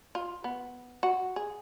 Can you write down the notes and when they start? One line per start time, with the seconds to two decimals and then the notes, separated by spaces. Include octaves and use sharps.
0.15 F4
0.44 B3
1.03 F#4
1.36 G#4